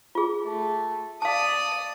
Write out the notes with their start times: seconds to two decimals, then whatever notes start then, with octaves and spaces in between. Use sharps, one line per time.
0.15 F4 G#4
0.43 A3
1.22 D5 F5 A5 D#6